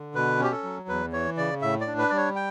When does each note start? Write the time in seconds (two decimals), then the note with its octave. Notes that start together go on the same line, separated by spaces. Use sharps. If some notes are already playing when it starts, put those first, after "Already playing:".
Already playing: D3
0.15 B2 B4
0.40 C#4 G4
0.52 A4
0.63 F#3
0.88 E2 B4
1.12 E3 C#5
1.37 C#3 D5
1.62 A2 E5
1.81 D5
1.87 D4
1.98 B4
2.10 G3 D5
2.17 C#5
2.36 G5